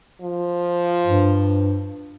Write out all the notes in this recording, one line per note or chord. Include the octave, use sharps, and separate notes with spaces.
F3
G2